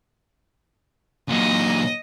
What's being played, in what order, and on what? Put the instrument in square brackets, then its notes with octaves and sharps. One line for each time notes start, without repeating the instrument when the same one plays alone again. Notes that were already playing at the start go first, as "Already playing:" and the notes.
[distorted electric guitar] A#2 F#3 [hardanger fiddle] D#5